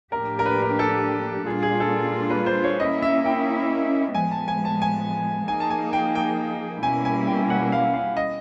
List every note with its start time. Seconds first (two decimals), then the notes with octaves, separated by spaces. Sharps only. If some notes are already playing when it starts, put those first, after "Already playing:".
0.12 A2 F3 A#3 D4 G4 A#4
0.39 A#4
0.46 B4
0.62 A#4
0.79 A4
1.46 A#2 G3 A#3 D4 F4 G#4
1.63 G#4
1.80 A4
2.30 B4
2.46 C5
2.64 C#5
2.80 A#3 C#4 E4 D#5
3.02 E5
3.25 G5
4.14 A2 F3 G#3 B3 G#5
4.31 A5
4.48 G#5
4.65 A5
4.82 G#5
5.48 F3 A#3 D#4 G#4 G#5
5.60 A5
5.70 G#5
5.93 G5
6.15 G5
6.82 B2 G3 A#3 C#4 E4 G#5
7.05 G#5
7.27 G5
7.50 F#5
7.72 F5
7.94 F5
8.17 D#5